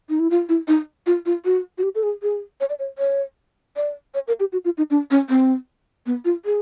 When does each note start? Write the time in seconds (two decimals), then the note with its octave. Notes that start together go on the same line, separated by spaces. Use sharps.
0.09 D#4
0.20 E4
0.31 F4
0.49 E4
0.68 D#4
1.06 F4
1.26 F4
1.45 F#4
1.78 F#4
1.83 G4
1.95 A4
2.03 G#4
2.22 G#4
2.60 C#5
2.69 D5
2.79 C#5
2.98 C#5
3.76 D5
4.14 C#5
4.28 A#4
4.40 G4
4.53 F#4
4.65 F4
4.78 D#4
4.91 D4
5.11 C#4
5.29 C4
6.06 B3
6.25 F4
6.45 G#4